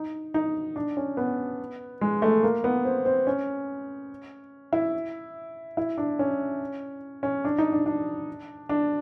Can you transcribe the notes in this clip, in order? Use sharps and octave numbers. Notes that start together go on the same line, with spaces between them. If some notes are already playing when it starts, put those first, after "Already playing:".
Already playing: D#4
D#4
D4
C#4
B3
G#3
A3
A#3
B3
C4
C4
C#4
E4
E4
D4
C#4
C#4
D4
D#4
D4
D4
D4